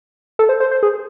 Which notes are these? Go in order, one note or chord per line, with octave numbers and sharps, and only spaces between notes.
A4
C5
C5
C5
G#4